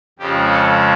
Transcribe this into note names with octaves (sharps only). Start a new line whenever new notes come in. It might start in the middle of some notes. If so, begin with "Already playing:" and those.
F2 C#3 F3 G#3 G4
A4